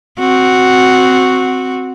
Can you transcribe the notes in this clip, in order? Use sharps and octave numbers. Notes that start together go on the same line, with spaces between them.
C4 F#4